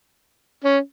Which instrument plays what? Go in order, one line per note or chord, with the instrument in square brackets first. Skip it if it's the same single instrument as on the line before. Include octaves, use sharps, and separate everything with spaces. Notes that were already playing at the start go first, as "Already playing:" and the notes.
[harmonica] C#4